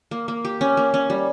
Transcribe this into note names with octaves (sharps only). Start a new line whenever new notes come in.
A#3
A#3
G4
C#4
A#3
C#4
G3